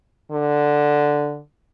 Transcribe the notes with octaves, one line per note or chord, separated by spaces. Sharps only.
D3